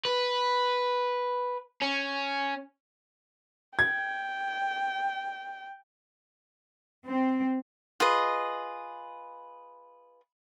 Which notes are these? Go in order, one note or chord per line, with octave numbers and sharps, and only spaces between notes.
B4
C#4
G5 G#6
C4
F4 G#4 B4 D#5